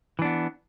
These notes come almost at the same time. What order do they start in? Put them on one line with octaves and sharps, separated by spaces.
E3 D4 B3